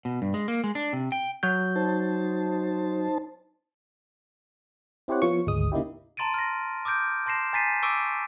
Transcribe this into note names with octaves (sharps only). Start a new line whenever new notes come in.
B2
G2
G#3
A#3
G#3
D4
C3
G5
F#3 F#4 G6
D#4 C5 A5
C4 E4 G4 C5 C#5 F#5
F3 B3 F4 C#5 C#6
G#1 D2 G#3 D#6
C#3 A#3 D#4 E4 G4
A5 A#5 C6 A6 D7 D#7
F6 A#6
D6 D#6 F6 G6 D7
A5 C6 A#6 C7 E7
G#5 A#5 A6 B6 C7 D#7
C#6 D6 E6 D7 D#7